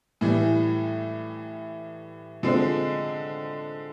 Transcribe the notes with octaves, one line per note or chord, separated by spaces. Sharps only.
A2 E3 G3
D3 F3 G#3 C4